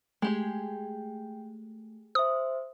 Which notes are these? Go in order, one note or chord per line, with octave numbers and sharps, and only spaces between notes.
G#3 A3 G4 G#4 G5
C5 E5 D#6